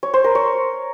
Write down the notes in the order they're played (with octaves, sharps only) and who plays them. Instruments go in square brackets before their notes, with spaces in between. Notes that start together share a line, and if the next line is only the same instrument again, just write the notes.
[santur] C#5
C5
A#4
C#5